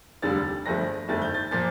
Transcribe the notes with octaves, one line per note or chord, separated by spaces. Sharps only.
F1 D#2 D3 G3 A6
G1 G2 F3 A3 A#6
G1 F2 D#3 A3 A6
G6
A6
A#2 F3 A6